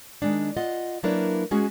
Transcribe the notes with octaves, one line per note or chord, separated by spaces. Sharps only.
D#3 G#3 D4
F4 D#5 F#5
F#3 A#3 D4 E4 A#4 B4
G#3 C#4 F#4 G#4